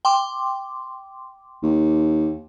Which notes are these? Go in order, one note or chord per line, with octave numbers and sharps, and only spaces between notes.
G5 C6 D6
D#2